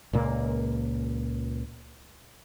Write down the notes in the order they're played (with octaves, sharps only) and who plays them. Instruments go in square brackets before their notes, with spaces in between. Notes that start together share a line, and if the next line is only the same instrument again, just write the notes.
[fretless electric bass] C#2 A#2 A#3